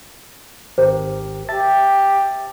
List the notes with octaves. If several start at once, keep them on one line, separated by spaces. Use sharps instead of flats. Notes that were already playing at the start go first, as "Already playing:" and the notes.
G#1 G4 A#4 C5
G4 E5 A5 A6